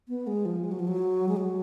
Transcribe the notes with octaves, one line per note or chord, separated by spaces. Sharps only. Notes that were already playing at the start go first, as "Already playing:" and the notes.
B3
G#3
F3
G#3
F#3
F3
F#3
G#3
F#3